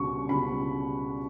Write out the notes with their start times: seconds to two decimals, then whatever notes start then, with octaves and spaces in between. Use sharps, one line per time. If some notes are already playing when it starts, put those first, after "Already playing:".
Already playing: C#2 B2 G3 C#6
0.29 C#2 B2 G3 B5